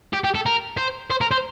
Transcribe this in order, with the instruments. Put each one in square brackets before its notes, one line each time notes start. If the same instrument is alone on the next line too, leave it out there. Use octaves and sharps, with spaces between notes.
[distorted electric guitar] G4
G4
A4
A#4
C5
C5
A#4
C5